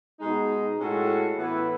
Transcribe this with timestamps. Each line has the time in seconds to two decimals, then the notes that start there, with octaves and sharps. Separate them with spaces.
0.20 B2 G#3 D#4
0.77 A2 G#3 C#4 F#4 A4
1.37 A2 E3 B3 E4 B4